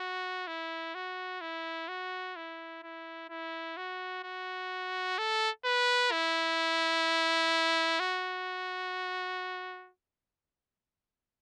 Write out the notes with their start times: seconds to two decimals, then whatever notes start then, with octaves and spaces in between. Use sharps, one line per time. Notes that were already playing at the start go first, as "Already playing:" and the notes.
Already playing: F#4
0.47 E4
0.95 F#4
1.41 E4
1.88 F#4
2.36 E4
2.83 E4
3.30 E4
3.77 F#4
4.24 F#4
5.18 A4
5.65 B4
6.12 E4
8.00 F#4